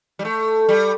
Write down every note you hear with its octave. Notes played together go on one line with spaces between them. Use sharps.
G3
A3
G3